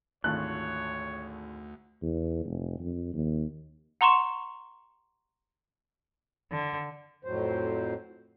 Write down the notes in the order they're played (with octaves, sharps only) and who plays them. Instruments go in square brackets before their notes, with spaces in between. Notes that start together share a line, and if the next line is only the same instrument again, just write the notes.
[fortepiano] G#1 A3 F4 [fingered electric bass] D2 [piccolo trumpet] C#5 [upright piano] F#6
[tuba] E2
F1
F2
D#2
[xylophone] F#5 A#5 C6 C#6 E7
[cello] D3
[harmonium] F2 A2 F#3 C5